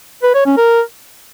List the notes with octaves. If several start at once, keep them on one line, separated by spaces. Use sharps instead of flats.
B4
C#5
C#4
A#4